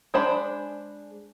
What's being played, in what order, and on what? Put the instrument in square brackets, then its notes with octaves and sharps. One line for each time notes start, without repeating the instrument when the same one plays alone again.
[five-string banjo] G#3 D4 C5 A5 B5